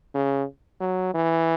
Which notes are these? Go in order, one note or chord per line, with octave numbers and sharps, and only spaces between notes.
C#3
F#3
E3